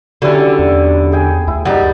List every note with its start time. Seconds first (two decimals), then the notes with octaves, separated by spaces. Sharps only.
0.22 D3 F#3 G3 C#4 E4
0.59 E2
1.12 G#4 G5 G#5
1.48 D2 E4
1.65 F#2 G3 D#4 F#5